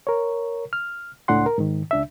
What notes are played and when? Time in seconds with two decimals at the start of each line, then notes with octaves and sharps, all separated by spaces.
0.07 A#4 C#5
0.73 F6
1.28 C#2 A2 D4 F#5 C6
1.46 A#4
1.58 G#2 D#3
1.91 C#2 D4 E5